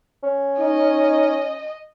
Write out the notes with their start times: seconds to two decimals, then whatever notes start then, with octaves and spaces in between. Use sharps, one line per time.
0.23 C#4
0.60 D#4 D#5